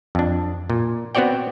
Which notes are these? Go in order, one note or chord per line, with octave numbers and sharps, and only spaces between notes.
F2 D4
A#2
B3 C4 F#4 C#5 D5 G5